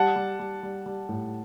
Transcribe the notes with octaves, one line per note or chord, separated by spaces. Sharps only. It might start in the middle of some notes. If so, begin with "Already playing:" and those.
Already playing: G3 F#5 A5
G3
G3
G3
G3
A2